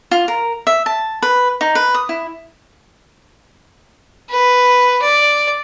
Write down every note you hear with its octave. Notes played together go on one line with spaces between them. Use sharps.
F4
A#4
E5
A5
B4
D#4
B4
D#6
E4
B4
D5